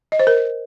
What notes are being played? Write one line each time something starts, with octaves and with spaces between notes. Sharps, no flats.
D#5
C5
A#4